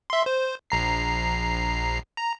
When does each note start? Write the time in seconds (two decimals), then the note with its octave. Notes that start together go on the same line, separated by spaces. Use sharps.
0.10 E5 C6
0.26 C5
0.70 A#1 A#5 C7
2.17 A#5